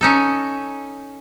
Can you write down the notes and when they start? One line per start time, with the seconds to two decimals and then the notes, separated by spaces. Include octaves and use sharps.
0.01 C#4 D#4 A4